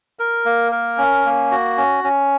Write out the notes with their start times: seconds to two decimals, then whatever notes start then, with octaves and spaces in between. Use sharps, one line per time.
0.19 A#4
0.45 A#3
0.72 A#4
0.98 C#4
1.25 A#3
1.51 F#4
1.77 C#4
2.04 C#4